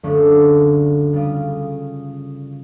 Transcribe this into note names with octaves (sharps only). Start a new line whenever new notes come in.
F#1 D2 D3 A3 C#4 D4
C#3 G3 F4 D#6